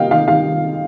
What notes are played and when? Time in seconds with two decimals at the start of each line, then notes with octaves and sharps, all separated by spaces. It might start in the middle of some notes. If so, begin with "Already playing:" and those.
Already playing: D#3 G3 A#3 D#5 F5 G5
0.11 D#3 F5
0.28 D#3 F5